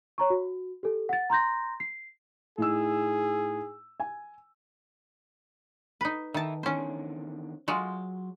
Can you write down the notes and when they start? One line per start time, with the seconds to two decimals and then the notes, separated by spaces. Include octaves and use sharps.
0.18 C#5 A#5 C#6
0.30 F#4
0.83 G4 A4
1.09 F#5 A6
1.30 A#5 C6 G6 A#6
1.80 C7
2.58 A2 D#4 G#4 E6
4.00 G#5
6.01 D#4 B4
6.34 D#3 B4 E5 A5
6.63 E2 D3 D#3 C#4 C5
7.68 F#3 G#3 F4 F#4 C6